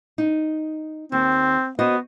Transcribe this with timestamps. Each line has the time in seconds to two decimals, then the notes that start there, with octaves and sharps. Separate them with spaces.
0.18 D#4
1.12 D#2 C4
1.79 B3 F#4 C5 D#5